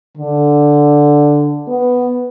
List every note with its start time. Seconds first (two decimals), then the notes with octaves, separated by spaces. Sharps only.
0.17 D3
1.67 B3